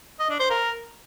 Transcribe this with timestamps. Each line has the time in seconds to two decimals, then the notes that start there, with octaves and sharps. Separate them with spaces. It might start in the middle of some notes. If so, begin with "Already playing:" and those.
0.20 D#5
0.30 D4
0.40 C5
0.50 A#4